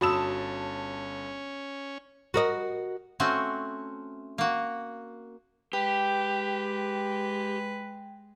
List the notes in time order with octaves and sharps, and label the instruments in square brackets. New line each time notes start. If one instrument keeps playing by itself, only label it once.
[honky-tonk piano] G1 A5 E7 [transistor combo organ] C#4 [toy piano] F#4 [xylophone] B5 D#6 E6
[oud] F#4 A#4 D#5
[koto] A3 C4 C#4 F#4
A#3 F#4
[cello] G#3 [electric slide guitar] G4 [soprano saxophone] B4 [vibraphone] G5